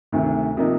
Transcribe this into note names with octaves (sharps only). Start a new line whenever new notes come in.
D2 C3 D#3
C3 F3 A#3 D#4